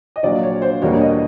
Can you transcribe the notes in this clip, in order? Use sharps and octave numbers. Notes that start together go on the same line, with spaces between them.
D#5
A#1 A#2 F#3 D5
C#5
C5
E2 B2 G3 A#3 D4 C#5
D#5